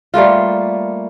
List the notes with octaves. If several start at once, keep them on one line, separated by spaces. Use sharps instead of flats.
G3 A3 A#3 F4